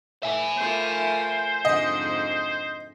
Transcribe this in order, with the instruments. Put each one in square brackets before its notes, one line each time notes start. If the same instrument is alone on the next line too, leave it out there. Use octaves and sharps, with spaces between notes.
[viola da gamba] A2 [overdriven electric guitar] E5 G#5
[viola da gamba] A3 F4 A#4 [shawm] C5
[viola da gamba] F2 G#2 D3 [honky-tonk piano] D#5